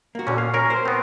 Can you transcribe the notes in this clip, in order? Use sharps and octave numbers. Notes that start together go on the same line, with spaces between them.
A#3 F#4
A#2 D3 C#4
F5
C#4 A#4
C5
B3 C4